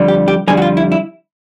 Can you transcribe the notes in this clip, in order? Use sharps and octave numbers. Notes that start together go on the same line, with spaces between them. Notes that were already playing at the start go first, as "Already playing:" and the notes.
Already playing: F2 D3 G3
G4
G4
F2 D3 G3 G#4
F#4
F4
E4
E4